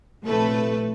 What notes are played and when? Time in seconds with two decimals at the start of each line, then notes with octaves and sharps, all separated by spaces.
0.24 A#1 A2 C3 A3 A4 B4